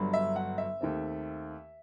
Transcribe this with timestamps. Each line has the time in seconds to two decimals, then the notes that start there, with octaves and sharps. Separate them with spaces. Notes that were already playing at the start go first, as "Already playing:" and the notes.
Already playing: G1 G2 F#3
0.13 E5
0.36 F#5
0.58 E5
0.81 D#2 D#3 A3 C4